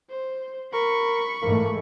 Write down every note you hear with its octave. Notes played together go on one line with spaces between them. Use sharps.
C5
A#4 B5 C#6
G#2 E3 A3 A#3